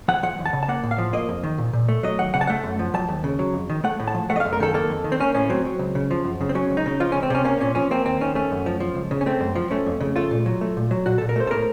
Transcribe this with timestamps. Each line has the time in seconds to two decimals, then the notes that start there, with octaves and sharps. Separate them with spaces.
0.08 F3 F#5
0.23 F3 F#5
0.39 D#2
0.46 A5
0.53 C#3
0.63 A5
0.68 A#3 F#5
0.83 A2
0.91 F5
0.98 F3
1.13 A#3 D#5
1.29 F2
1.44 D#3
1.58 A#2
1.73 A#2
1.88 A3
2.03 F#3 D#5
2.19 D#2 F#5
2.34 C#3 F#5
2.41 A5
2.47 A3 F#5
2.63 F#2
2.79 F3
2.94 F#3 A5
3.09 D#2
3.24 C#3
3.39 F#3
3.54 F2
3.70 D#3
3.84 A3 F#5
4.00 A2
4.07 A5
4.14 F3
4.30 A3 F#5
4.36 D#5
4.40 F#2 F5
4.53 A#4
4.60 D#3 A4
4.74 A#3 A4
4.90 F2
5.04 D#3
5.12 C4
5.20 A#3 C#4
5.35 A2 C#4
5.50 F#3 C4
5.65 F#3
5.79 C#2
5.95 C#3
6.11 F3
6.24 F#2
6.41 C#3
6.49 C4
6.55 F#3 C#4
6.70 C#2
6.77 D#4
6.86 C#3
7.00 F3 F4
7.12 C#2 C#4
7.23 C4
7.30 C3 C#4
7.45 A#3 C#4
7.60 A#2 C#4
7.75 F3 C#4
7.91 A#3 C4
8.06 D#2 C4
8.21 D#3 C#4
8.35 A3 C#4
8.51 F#2
8.66 F3
8.80 F3
8.95 C#2
9.11 C#3
9.21 C#4
9.26 A3 C4
9.41 F#2
9.55 F3
9.71 A3 C#4
9.86 F2
10.00 C#3
10.16 A3 F4
10.31 A#2
10.46 F#3
10.61 A3
10.77 A#2
10.91 F#3
11.06 A#2 F#4
11.18 A#2 A4
11.29 A#4
11.36 A3 C5
11.47 A4
11.51 A2 A#4